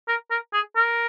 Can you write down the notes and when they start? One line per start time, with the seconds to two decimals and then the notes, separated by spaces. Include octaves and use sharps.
0.08 A#4
0.31 A#4
0.54 G#4
0.76 A#4